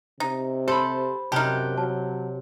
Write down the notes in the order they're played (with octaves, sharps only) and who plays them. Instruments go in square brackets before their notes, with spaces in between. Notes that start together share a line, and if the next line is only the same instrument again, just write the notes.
[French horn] C3 [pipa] D#4
[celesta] G4 C6 [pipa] A4 [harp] C5 B5
[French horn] F#2 [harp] C3 A#5 F#6 [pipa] D#4 G4 [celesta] A5 F6
[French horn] F#3 [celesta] A5